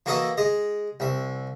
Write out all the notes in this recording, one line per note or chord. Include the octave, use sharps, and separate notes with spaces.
E3 A#3 F#4 A4 D#5 E5
G#3 D#5
C2 E5